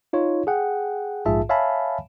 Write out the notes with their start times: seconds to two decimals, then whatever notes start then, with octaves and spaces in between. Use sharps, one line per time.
0.13 D#4 F4 C#5
0.47 G#4 F#5 G5
1.26 A#1 G#2 F4 G#4 E5 A5
1.49 C#5 E5 F5 G#5 A5 B5